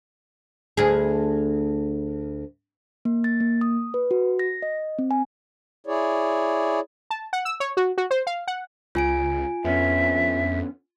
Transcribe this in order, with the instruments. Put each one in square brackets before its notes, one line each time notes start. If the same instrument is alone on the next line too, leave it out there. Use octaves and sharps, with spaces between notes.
[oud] D2 G#4
[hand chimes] A#3
A6
A#3
D#6
B4
F#4
A#6
D#5
C4
G#5
[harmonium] E4 G#4 C#5 D5
[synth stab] A5
F#5
E6
C#5
F#4
F#4
C5
F5
F#5
[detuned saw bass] C#2 [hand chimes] F4 G#5 D7
[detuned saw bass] F2 [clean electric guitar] D3 B3 C#4 [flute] E5